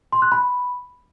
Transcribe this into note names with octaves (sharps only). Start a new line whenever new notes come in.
C6
F#6
B5